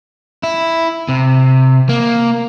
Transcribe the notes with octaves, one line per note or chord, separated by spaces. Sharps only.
E4
C3
A#3